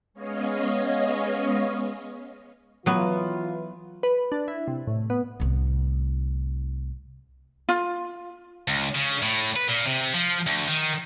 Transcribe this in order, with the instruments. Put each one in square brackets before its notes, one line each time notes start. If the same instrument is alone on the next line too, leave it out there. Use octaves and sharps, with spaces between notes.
[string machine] G#3 B3 C#4 C#5 D#5 F5
[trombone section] E3 F4 [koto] F#3 B3
[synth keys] B4
D4
E4
C3
A2
B3
[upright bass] C2 A2
[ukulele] F4
[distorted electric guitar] C#2
C#3
A2
B4
A#2
C3
F3
D2
D#3